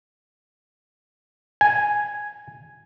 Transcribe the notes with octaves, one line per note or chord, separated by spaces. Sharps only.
G#5